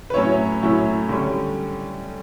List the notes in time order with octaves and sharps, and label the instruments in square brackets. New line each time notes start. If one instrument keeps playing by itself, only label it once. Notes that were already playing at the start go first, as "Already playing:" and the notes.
[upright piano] B4
A2 F#3 C#4 E4 C#5
A2 F#3 C#4 E4
D3 G3 C#4